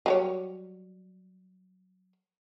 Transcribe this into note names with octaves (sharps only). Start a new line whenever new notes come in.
F#3 G3 C#5